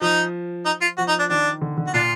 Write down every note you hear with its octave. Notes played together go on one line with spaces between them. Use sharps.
F3 D#4
D#4
F4
F3 F#4
D#4
D4
D#3 D4
D3
D3
F#4
A#2 D4 F4